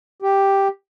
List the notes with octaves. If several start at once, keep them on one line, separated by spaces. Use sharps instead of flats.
G4